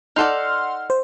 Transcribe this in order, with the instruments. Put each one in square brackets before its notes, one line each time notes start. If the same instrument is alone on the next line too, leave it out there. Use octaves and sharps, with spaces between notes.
[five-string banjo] D#4 A4 D5 [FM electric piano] F#5 C6 F6
[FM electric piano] C5